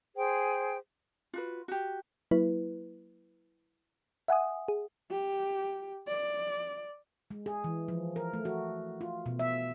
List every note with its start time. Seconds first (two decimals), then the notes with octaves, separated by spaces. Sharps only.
0.16 G#4 C5 G5
1.33 F4 F#4 B4
1.68 F#4 G4
2.31 F#3 A#3 E4 B4
4.28 E5 F#5 G#5 D#6
4.68 G#4
5.11 G4
6.08 D5
7.31 G#3
7.46 G#4
7.64 E3
7.88 F3
8.16 A#4
8.33 A3
8.45 F#4
9.01 F4
9.26 B2
9.39 E5